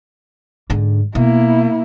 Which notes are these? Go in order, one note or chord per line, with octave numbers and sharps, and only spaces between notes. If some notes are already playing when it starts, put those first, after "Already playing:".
G#2 D3
B2 A#3 E4